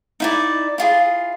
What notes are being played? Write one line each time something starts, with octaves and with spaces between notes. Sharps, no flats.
D#4 E4 D5
E4 F4 G#4